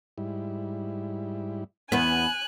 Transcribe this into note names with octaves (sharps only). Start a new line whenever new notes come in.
G#2 G3 E4
E2 B3 G#5 F#6